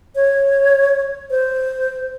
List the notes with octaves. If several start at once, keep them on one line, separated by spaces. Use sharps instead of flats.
C#5
C5